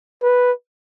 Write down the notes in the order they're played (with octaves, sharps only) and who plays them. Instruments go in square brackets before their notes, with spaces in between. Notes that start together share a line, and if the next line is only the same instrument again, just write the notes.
[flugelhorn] B4